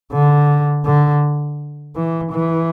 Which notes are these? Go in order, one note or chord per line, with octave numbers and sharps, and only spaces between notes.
D3
D3
E3
E3